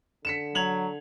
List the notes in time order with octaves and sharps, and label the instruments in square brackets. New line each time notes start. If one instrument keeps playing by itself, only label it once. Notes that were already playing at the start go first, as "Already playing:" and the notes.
[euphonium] D3 [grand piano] B6 C#7 E7
[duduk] F#3 [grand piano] G#6 F7 F#7